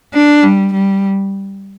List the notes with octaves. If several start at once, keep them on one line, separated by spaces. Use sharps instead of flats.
D4
G3
G3